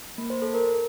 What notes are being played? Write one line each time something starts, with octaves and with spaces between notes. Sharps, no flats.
A#3
C5
A4
A#4